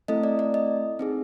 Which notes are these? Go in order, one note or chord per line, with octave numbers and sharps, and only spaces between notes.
A3 C4 E4 A4 D#5
D5
D5
D#5
C4 D#4 G#4